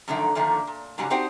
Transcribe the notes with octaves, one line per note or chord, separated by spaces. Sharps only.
F#2 A2 D3 D#3 F3
D3 D#3 F3 A3 A#3
A#2
G#2 C#3 F#3 G3
C4 D4 D#4 F#4 G4 C5